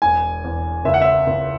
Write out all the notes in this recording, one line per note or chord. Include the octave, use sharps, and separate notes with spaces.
E1 G#5
E2
C#2 E5
F#5
E5
C#2